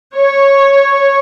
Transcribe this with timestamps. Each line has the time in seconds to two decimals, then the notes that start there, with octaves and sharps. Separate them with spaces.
0.15 C#5